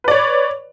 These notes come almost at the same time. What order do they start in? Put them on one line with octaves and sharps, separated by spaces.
B4 D5 C#5